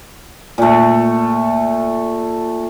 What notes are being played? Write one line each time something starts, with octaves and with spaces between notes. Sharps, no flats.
A#2 A3